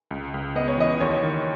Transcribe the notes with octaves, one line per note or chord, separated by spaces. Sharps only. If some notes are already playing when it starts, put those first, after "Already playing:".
C#2
C#2
B3 D#5
C#5
E3 D#5
D#2 C#5
D#3